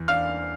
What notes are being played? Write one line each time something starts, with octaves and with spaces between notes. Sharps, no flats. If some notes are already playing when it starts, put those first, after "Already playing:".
Already playing: E2
D4 F5 F6